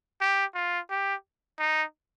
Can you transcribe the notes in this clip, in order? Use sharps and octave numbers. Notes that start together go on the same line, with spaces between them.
G4
F4
G4
D#4